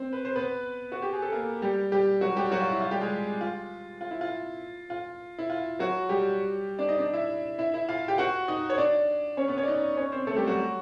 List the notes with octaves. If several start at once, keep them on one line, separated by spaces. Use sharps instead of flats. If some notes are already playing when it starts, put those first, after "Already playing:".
Already playing: C4 C5
B4
C5
B3 B4
F#4
G4
G#4
A4
A#3 A#4
G3 G4
G3 G4
F#3 F#4
G3 G4
F#3 F#4
F4
E4
F4
G3 G4
G#3 G#4
F4
F4
E4
F4
F4
E4
F4
F#3 F#4
G3 G4
D4 D5
D#4 D#5
D4 D5
E4 E5
E4 E5
E4 E5
F4 F5
G4 G5
F#4 F#5
D#4 D#5
C#5
D4 D5
C#4 C#5
B3 B4
C#4 C#5
D5
D#4 D#5
C#4 C#5
C4 C5
A3 A4
G3 G4
F#3 F#4